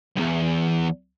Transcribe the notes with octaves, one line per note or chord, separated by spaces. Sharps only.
B1 E2